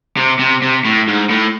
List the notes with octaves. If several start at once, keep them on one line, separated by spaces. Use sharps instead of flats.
C3
C3
C3
A2
G#2
A2